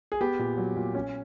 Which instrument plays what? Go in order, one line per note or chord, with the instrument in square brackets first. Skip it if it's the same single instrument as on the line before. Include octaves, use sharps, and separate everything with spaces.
[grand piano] G#4
B3 G4
A#2
F#3
A#2
C#4